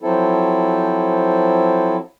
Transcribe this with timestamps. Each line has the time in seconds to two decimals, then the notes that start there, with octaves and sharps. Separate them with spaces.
0.02 F3 F#3 C4 E4 A4